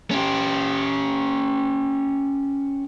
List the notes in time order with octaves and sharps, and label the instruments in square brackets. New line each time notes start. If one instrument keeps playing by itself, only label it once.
[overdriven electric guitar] C#4 G4